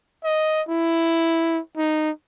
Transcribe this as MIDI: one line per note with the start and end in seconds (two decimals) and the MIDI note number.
0.24 0.62 75
0.69 1.60 64
1.77 2.10 63